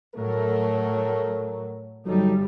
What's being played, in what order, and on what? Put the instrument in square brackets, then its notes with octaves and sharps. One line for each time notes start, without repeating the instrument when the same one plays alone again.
[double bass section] A2 F#3 [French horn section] A3 A4 A#4
[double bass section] G1 G3 [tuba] F#3 [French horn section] D#4 A4